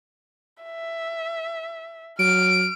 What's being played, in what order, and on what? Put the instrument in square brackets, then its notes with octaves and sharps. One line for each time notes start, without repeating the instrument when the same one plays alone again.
[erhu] E5
[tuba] F#3 [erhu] F6 [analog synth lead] D7